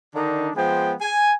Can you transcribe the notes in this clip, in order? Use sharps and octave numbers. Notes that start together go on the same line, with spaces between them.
D3 D#3 D4 D#4
F3 G#3 B3 G5
G#5